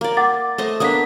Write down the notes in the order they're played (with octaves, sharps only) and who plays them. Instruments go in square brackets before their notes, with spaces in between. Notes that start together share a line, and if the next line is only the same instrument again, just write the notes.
[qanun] A#3 D5
[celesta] F#5 D6 A6
[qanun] A3 C5 D#5
[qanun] A#3 B3 D4 [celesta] D#6 B6